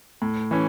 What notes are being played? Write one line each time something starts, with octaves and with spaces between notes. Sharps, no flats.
A2
E3 A3 C#4